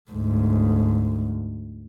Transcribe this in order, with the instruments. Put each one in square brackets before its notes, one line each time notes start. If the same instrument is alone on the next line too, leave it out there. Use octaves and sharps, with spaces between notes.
[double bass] D2 G#2